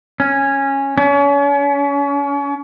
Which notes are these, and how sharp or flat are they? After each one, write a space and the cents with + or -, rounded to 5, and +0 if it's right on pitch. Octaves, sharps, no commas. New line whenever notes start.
C#4 -10
C#4 +35